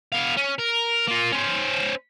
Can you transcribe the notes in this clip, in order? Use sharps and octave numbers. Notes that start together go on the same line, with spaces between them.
B3 F5
C#4
A#4
A#3 F4
C#4 C5